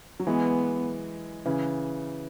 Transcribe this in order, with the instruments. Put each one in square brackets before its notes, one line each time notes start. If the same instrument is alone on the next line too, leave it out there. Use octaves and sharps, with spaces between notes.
[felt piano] F#3
[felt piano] E3 G#3 [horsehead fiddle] B3
[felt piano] C#3 E3